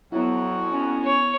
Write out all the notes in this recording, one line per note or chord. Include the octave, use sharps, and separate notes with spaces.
F2 F#3 B3 E4 F#4
C#4
C#5